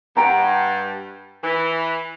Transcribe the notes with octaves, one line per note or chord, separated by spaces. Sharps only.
G2 F#5 G5 A#5
E3